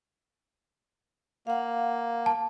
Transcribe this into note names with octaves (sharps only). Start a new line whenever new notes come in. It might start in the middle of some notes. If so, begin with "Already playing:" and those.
A#3 F5 F#5
A5